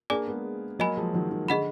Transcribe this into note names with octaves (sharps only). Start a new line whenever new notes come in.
A#3 D4 G#4 D5 G#5 D6
G#3 B3
F#3 A#3 D#5 G#5 B5
F3 G#3
D#3 F#3
D#3
D3 G#4 D#5 F#5 B5